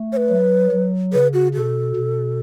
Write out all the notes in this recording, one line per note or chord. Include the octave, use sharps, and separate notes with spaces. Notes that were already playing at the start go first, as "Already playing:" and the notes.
Already playing: A3
C#5
B4
F#3
F#3
C#3 B4
F#4
B2 A4
B2